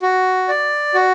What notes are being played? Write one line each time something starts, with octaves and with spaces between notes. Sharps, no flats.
F#4
D5
F#4